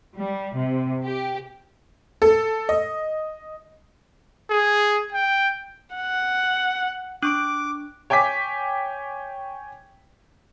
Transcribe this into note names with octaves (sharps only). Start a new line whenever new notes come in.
G3
C3
G4
A4
D#5
G#4
G5
F#5
D4 C#6 D6 F#6 D7
C#5 G5 G#5 D6 B6